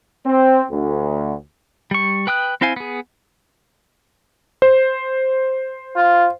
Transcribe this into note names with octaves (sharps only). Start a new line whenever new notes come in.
C4
D2
G3 C#6
B4 G5 D#6 F#6
C4 E4 C5 F5 G#5
B3 G#4
C5
F4